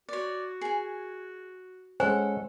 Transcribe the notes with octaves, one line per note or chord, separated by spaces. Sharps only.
F#4 C#5 D5
G#4 G#5
G#3 C#4 A4 C5 F#5 G#5